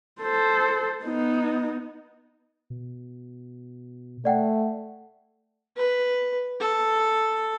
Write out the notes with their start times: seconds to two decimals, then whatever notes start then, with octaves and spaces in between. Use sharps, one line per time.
0.22 A4 C5
1.04 B3 D#4
2.70 B2
4.25 A3 D5 F#5 G5
5.76 B4
6.60 A4